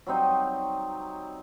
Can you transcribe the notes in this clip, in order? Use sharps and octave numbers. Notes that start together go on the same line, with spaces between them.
F#3 G3 C4 D#4